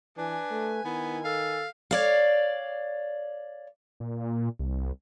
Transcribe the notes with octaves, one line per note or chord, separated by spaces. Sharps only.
E3 D4 B4 G#5
A3
D#3 B3 E4
A4 F5
C#5 D5 F5
A#2
C2